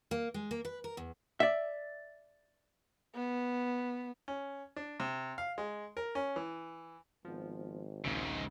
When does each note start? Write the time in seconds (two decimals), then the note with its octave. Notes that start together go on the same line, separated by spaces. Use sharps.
0.11 A#3
0.34 G#3
0.51 A#3
0.65 B4
0.84 A#4
0.97 E2
1.40 D5 E5
3.15 B3
4.28 C#4
4.76 D4
5.00 C3
5.38 F5
5.58 G#3
5.97 A#4
6.15 C#4
6.36 E3
7.25 G#1 F3 B3
8.04 A#1 D#2 G#2 C#3 E5